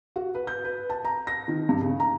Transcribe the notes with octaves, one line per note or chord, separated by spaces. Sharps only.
F#4
B4
G6
B4
A5
A#5
A#6
D#3
G2
C#3
A#5